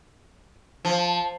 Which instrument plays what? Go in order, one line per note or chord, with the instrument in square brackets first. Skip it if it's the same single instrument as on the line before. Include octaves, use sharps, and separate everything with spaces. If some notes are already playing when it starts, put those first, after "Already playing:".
[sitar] F3